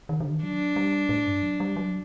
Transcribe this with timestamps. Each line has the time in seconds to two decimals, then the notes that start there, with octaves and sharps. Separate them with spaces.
0.09 D#3
0.20 D3
0.32 D#3
0.43 F#3 D4
0.76 G3
1.09 A2
1.26 G2
1.43 F#3
1.60 G3
1.76 F#3